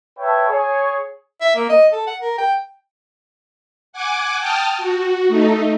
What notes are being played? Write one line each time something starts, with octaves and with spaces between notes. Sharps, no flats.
B4 C#5 E5 G5 A5
G#4 C#5
E5
A#3
D#5
A4
F#5
A#4
G5
F#5 G#5 D6
G5 A5 D#6 F6
F#4
A3 D#4